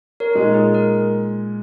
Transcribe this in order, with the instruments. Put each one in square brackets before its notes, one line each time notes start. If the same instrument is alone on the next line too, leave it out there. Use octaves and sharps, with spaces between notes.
[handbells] A#4 C#5
[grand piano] A#2 G#3 D#4 [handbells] A#4
[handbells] G#4
A#4